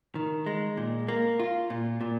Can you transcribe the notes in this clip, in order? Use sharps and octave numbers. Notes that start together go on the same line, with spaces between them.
D#3
G#3
A#2
A#3
F4
A#2
A#2